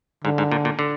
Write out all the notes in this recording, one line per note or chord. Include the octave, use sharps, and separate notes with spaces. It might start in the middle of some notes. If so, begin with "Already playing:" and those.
G#2 D3
G#2
A#2
A#2
D3